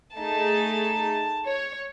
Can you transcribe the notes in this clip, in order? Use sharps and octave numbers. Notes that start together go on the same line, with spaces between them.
A3 D#4 G#4 A5
C#5